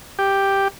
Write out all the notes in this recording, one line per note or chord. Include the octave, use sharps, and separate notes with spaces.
G4